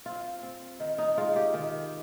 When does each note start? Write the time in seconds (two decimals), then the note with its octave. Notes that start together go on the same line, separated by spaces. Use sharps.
0.06 C4 F4
0.43 C4
0.80 D#3
0.98 D#4
1.17 G#3 F4
1.36 G4
1.54 D#3